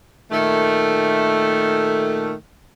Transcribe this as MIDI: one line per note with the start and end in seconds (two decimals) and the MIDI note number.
0.31 2.33 46
0.31 2.33 51
0.31 2.33 57